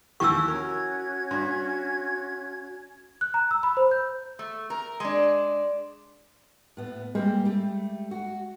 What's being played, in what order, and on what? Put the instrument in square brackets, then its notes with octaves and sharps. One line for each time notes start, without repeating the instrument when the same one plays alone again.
[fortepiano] D#2 E3 G4 [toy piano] C#6 E6
[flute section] C#4 F#4 G#6 [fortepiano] A#4
[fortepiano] G2
[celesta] F#6
A#5
E6
B5
C5
G6
[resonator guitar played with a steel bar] A3
A#4
G#3 D4
[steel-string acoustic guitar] A2 B3
[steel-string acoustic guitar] G3 A#3 C4 [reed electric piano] G#3
[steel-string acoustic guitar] G3 A3
F#4